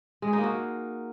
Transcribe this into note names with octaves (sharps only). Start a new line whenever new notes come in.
G#3
G#4
D#4
A#3
F#4